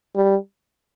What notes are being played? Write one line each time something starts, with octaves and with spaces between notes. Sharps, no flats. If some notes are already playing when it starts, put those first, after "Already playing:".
G3